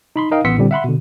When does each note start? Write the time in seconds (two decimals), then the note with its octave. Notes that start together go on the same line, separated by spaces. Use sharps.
0.16 D#4 B5 C6
0.31 D#4 A#4 D#5 F5 G5
0.45 A1 B3 C6 E6 B6 C#7
0.57 A#2 D3 G3 C4
0.71 E5 F#5 B5 C6
0.84 B2 D3